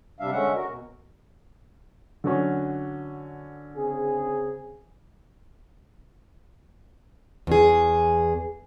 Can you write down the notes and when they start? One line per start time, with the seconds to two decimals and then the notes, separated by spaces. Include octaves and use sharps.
0.20 C3 G3 D4 E5 F5
0.32 D3 G#3 C#4 E5 F#5
0.55 F#4 A#4
0.67 B2
2.24 D3 F#3 C#4
3.76 C#3 C4 G#4
7.47 E2 G#4